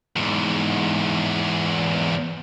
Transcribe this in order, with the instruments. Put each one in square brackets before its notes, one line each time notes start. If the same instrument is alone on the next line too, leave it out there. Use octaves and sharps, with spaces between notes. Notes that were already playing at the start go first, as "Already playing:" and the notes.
[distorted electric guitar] E2 G#2